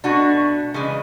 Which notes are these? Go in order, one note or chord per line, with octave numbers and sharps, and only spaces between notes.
B2 A3 D4 F#4
C#3 E3 G#3